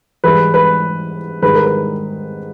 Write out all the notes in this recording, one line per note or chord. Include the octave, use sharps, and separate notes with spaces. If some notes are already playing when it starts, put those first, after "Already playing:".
G#2 E3 G3 B4
B4
G#2 D#3 G3 B4
A#4
B4